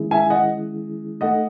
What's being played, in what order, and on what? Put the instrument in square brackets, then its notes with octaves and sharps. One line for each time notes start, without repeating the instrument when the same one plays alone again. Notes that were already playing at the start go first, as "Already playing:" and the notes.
Already playing: [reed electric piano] D#3 G#3 C#4 E4 G#4
[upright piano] E5 G#5
D#5 F#5
[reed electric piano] A3 D#4 A4 [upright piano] D#5 F#5